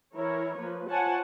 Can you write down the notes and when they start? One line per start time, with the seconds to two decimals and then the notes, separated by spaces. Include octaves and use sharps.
0.15 E3 E4 A#4 C#5
0.58 F3 A#3 B4
0.89 F4 C5 C#5 F#5 G#5 A5